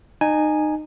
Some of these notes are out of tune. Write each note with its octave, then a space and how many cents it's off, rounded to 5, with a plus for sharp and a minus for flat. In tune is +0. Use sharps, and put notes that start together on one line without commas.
D#4 -25 G#5 +0